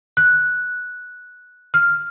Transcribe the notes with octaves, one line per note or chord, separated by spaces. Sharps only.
F#6
F6